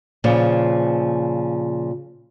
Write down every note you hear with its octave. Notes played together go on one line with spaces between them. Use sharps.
A#2 C#3 F3